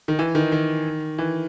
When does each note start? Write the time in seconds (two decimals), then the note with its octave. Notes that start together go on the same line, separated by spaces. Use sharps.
0.08 D#3
0.19 E3
0.35 D#3
0.52 D#3
1.19 E3